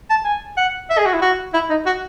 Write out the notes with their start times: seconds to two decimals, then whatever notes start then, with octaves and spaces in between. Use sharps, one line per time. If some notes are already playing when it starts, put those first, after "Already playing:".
0.10 A5
0.25 G#5
0.57 F#5
0.90 E5
0.98 G#4
1.06 F#4
1.13 E4
1.22 F#4
1.54 E4
1.70 D#4
1.86 F#4